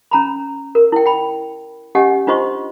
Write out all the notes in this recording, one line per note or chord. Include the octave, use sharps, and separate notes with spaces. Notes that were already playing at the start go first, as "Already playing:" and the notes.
C#4 A#5 B5
A#4
E4 G5
G5 B5
C#4 G4 D#5 F#5 G#5
D4 F4 C5 D#5 C6 C#6